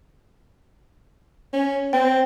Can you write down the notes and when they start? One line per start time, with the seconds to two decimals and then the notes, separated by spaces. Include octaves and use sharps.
1.53 C#4
1.93 C4 G5